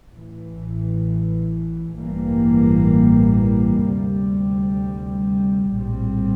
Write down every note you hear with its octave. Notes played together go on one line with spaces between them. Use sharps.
A1 A2 E3
A1 G2 E3 G3 A#3
D2 C3 G3
A#1 A2 G3 C4